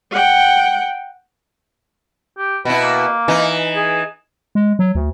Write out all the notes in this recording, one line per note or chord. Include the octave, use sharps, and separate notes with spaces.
F#5 G5
G4
B2 E4 B4
A#3
E3 D#4
G#4
G#3
F#3
D2